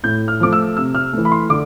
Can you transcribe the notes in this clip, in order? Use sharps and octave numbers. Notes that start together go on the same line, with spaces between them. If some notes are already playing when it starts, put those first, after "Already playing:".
A2 G6
F6
F3 A3 D6
E6
C3 E6
F6
E3 A3
B5
C6
D3 D6